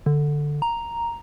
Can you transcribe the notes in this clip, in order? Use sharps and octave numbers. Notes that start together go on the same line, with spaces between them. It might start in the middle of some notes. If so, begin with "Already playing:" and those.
D3
A#5